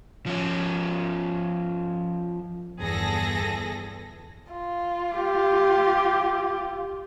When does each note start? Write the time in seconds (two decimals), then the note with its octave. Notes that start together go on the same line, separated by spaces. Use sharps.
0.26 F3 C#4
2.78 G1 E2 G#4 A4 A#6
4.53 F4
5.15 G4